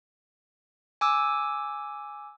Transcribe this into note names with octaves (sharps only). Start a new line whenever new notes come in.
G#5 D6 E6